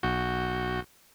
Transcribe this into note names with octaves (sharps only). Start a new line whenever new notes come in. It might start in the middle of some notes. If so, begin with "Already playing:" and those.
B1 F#4 G6